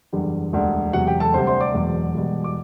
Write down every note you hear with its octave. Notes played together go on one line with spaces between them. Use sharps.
F#1 E2 D3 G3
E1 D2 D3 G3
E1 E2 C3 F#3 F#4 F#5
G4 G5
A4 A5
D2 C3 G3 C5 C6
C5 C6
D5 D6
E1 E2 B2 F#3
E1 E2 B2 G3
D6